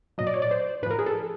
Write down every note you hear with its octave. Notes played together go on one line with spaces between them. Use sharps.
A#2 F#3 D#5
D5
C#5
D5
C5
A2 F3 A#4 B4
G#4
A4